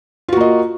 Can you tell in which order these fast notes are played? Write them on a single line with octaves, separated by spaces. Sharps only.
F4 F#4 A#3 D#5